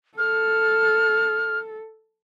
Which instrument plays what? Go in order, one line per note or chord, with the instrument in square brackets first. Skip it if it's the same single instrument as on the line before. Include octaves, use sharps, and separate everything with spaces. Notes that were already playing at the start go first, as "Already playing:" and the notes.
[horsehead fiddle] A4 [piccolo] F6